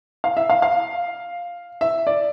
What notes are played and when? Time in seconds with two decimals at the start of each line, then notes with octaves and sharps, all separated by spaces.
0.24 F5
0.37 E5
0.50 F5
0.62 F5
1.81 E5
2.07 D5